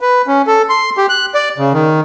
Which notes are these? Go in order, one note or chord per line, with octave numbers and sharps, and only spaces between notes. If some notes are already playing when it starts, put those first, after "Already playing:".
B4
C#4
A4
C6
G4
F#6
D5
C#3
D#3